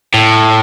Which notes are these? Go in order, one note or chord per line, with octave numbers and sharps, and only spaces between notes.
A2